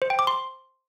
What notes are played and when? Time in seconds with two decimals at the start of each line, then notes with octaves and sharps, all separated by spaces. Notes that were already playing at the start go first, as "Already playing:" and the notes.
0.02 C5
0.10 G5
0.19 D6
0.27 C6